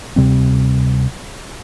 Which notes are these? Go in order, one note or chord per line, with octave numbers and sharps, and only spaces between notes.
D2 C3 G3 C4